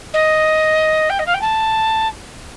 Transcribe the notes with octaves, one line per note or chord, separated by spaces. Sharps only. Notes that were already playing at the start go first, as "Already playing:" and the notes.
D#5
G5
D#5
F5
G5
A5